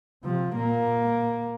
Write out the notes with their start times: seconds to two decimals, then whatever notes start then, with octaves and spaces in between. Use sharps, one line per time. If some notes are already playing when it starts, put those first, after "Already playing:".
0.24 C3 F3
0.55 A#2 A#3